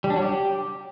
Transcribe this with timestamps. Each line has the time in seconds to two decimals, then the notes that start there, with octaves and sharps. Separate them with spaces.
0.04 G3
0.10 D4
0.16 F#3
0.22 G4